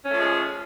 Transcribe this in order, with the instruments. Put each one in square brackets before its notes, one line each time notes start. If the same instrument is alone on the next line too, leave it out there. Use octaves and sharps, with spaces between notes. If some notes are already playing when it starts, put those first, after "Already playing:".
[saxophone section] C#4
A3
F3
G#3